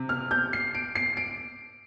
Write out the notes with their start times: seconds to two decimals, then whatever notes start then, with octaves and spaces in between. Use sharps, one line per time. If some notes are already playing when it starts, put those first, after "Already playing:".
Already playing: C3
0.09 F6
0.31 G6
0.53 C7
0.75 D7
0.95 C7
1.17 D7